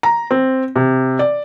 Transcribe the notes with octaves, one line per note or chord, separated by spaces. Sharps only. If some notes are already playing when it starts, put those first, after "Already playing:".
A#5
C4
C3
D5